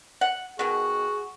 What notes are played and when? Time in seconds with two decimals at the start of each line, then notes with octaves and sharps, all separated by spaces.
0.21 F#5
0.59 B2 D#3 F#4 G#4